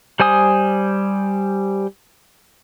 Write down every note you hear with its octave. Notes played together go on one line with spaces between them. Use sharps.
G3 C5 G#5 D#6